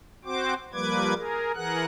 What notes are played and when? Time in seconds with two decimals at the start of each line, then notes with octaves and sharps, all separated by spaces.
0.25 C4 F#4 C5 D6
0.73 F3 G3 A#3 B4 D6 G#6
1.15 G#4 A#4
1.55 E3 G#4 A#4 F#5 F#6